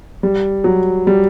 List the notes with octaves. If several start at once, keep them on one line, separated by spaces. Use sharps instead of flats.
G3
F#3
G3